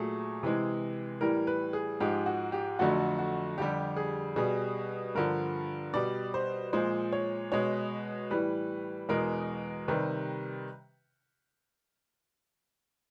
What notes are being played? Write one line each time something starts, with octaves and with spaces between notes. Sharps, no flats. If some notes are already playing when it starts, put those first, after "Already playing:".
Already playing: A#2 F#3 A3 G#4
C3 E3 G#3
A2 E3 G3 A#4
B4
G#4
G#2 F3 G#3 G4
F#4
G4
F2 D3 F#3 A3 F#4
F#4
F2 D3 G3 G4
G#4
B2 G3 G#4
G2 D3 F3 A#4
B2 G3 D5
C5
A#2 F3 G#3 C5
C#5
B2 G#3 C#5
A2 E3 G3 B4
E2 B2 G#3 A#4
C3 D#3 G3 B4